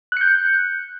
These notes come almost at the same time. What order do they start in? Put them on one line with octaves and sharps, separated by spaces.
F#6 C#7 G6